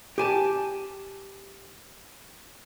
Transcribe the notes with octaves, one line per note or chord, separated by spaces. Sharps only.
G4 G#5 A5